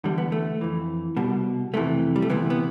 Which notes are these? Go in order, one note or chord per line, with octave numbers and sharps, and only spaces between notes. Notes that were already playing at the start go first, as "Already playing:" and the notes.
E2 D3 G3
B3
A3
F2 E3
C2 B2 G3
F2 C3 E3 A3
G3
A3
D2 C3 E3 B3
B3